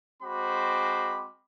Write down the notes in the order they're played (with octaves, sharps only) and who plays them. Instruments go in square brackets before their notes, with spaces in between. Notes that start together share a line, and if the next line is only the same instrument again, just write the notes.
[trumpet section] G#3 C4 F#4 C5 B5 D6